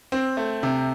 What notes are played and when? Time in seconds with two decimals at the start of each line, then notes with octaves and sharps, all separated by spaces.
0.12 C4
0.37 A3
0.63 C3